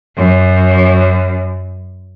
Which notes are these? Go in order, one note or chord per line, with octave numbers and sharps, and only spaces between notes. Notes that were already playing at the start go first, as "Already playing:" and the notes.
F#2